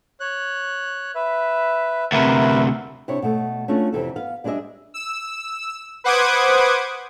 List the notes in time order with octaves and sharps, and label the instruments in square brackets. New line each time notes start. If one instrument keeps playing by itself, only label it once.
[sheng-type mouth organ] C#5 F#6
B4 E5
[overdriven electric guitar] D2 C3 [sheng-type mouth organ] A#4 B4 E5
[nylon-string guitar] C3 D4 E4 C#5
B2 A3
A3 C#4 D4 F4 F#4
F2 C3 E3 A4
B3 F5
G3 D4 G#4 B4 D#5 E5
[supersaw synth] E6
B4 C5 F#5 D6 D#6 G#6